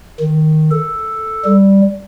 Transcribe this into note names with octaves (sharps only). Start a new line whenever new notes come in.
D#3
A4
G3